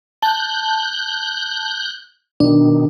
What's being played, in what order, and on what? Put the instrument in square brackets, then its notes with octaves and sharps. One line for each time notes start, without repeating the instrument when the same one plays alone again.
[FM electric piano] A5 [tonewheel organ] F#6 G6
[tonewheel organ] B2 D#3 [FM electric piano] D4